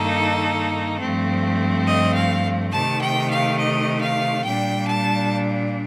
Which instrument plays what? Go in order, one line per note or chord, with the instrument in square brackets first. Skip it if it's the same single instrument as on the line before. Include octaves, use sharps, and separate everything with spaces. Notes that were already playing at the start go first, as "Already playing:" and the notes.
Already playing: [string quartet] G2 D#3 A#3 D#4 A4
G2 F3 A3 C4
D#5
F5
C3 D#3 A3 A5
G5
F5
D#5
F5
A#2 G3 D4 G5
A5